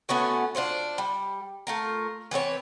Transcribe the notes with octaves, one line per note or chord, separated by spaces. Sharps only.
A3 B3 C#4 F#4
D4 F4 C5 C#5
G3
A3 F4 A#4
E3 B3 C4 C#5